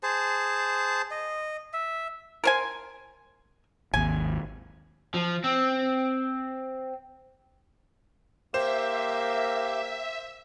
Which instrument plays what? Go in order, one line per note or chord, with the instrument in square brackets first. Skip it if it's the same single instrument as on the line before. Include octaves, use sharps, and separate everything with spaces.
[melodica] G#4 C5 A5
D#5
E5
[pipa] A#4 C5 G#5
[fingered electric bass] G#1 D#2 [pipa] G#5
[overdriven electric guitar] F3
C4
[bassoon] A#3 [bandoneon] G4 [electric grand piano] C5 E7 [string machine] E5